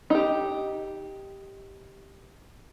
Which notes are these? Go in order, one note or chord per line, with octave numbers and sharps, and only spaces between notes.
D#4 G4